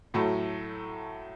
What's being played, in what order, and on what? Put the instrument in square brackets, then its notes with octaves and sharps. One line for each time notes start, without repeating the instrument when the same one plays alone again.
[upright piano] A2 F#3 A3